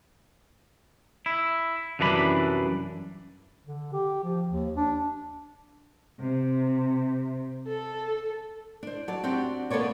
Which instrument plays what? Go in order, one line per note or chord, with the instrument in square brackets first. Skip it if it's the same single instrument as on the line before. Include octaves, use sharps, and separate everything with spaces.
[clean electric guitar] E4
C2 F#2 E3 D4 A#5 B5
[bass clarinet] D3
G4
F3
D#2
D4
[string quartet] C3
A4
[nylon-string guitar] D4 C5
F#3 D5 A5
C4 D4 F#4 G4
A#3 B3 A4 B4 C#5 D5